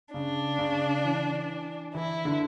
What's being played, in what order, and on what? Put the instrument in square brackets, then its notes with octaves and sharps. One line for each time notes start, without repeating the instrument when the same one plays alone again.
[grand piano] C#3 [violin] D4
[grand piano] C#3
E3
[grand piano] E3 [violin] E4
[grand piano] D3